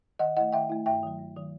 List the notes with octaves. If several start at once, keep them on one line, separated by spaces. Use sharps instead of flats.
D#3 D#5 F#5
A3 E4 D#5 F#5
D#3 E5 G5
A3 E4
G2 E5 G5
D#3 F#3
G2
D#3 F#3